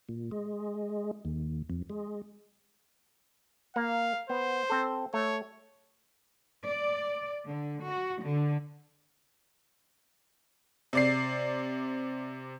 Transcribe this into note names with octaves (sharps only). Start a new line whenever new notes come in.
A#2
G#3
D#2
F2
G#3
A#3 F5
B3 C5
C4 A4
A3 C#5
D5
D3
F#4
D3
C3 D5 C7